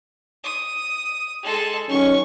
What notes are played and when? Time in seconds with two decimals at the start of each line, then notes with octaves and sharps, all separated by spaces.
0.44 D#6
1.43 G#3 A4
1.89 D#3 F#3 C#4 C#6